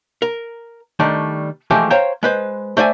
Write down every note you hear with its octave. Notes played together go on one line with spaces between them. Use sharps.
A#4
D#3 G3 A3 D4
E3 F3 G#3 A3 G4
C5 C#5 F5 G5 A#5
G#3 B4 C5
A3 C5 D5 E5 G#5